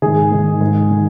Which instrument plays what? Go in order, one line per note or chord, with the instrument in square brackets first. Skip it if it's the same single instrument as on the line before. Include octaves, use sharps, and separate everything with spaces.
[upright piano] G#2 D#3 G#4
G#2 D#3
G#2 D#3
D#3